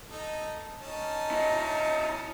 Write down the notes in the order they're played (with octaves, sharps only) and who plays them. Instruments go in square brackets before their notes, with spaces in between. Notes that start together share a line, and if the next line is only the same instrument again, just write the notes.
[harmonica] D#4 A4
C#4 D#4 A5
[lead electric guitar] E4 D#5